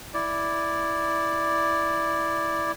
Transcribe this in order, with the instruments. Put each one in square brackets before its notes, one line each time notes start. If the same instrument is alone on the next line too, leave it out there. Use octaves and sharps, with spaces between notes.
[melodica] E4 D5